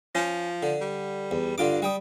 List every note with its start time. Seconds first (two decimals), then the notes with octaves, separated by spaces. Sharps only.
0.15 F3 C#4
0.63 D3
0.81 G3
1.31 E2
1.58 G2 D3 F4 D6
1.82 G3 G5 D#6